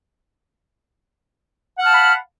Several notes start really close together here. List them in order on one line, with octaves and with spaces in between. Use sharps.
F#5 F6 A5 F5 B5